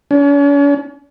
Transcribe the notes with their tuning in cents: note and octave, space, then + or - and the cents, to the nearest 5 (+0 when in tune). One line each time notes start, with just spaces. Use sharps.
C#4 +45